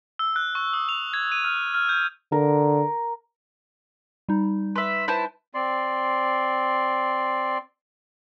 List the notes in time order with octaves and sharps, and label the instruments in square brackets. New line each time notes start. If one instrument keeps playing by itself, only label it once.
[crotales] E6
F#6
C#6
D#6
F7
G#6
D#7
F6
F6
G6
[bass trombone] D3 [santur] A#4
[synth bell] G3 D#4
[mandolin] B4 E5 [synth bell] C6
[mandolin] E4 C5 A5 [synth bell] B4 G6
[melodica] C4 D5 C6